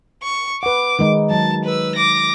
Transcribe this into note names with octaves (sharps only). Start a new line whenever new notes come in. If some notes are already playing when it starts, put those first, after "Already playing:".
C#6
B4 F#5 D6
D#3 G#3 D#4
F#3 A5
B4 E6
D6 A#6